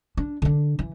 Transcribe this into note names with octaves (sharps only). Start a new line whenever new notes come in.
D4
D3 D4
E3